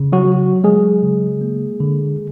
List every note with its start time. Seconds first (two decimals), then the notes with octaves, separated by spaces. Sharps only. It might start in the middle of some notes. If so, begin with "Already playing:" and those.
Already playing: C#3
0.12 F#3 F#4
0.25 F#3
0.64 F#3 G#3 G#4
1.03 C#3
1.41 A#3
1.80 D3